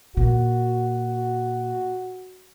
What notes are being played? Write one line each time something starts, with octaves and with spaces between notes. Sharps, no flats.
A#2 F#4